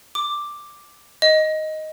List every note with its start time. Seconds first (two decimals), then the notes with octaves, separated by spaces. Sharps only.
0.15 D6
1.22 D#5